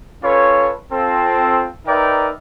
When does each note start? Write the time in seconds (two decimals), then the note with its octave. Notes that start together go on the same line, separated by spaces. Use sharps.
0.24 C#4 F4 A4 B4 C#5
0.92 C4 F4 A4
1.87 D#4 A#4 B4 D5 E5 G5